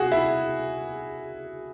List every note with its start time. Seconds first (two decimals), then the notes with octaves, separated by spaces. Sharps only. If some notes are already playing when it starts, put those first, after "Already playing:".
Already playing: F#4 G#4
0.12 E4